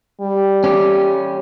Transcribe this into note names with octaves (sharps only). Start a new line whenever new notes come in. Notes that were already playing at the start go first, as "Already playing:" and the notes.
G3
C#4 G4